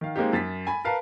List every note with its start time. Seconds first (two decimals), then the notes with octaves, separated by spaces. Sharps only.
0.01 D#3 F5
0.16 G#3 A#3 C4 D#4 G4
0.33 F#2 A6 B6
0.67 G#5 B5
0.85 A#4 B4 F5 A5 A#5